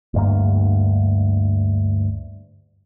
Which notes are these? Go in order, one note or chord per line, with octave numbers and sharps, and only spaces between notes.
D2 G2 A#3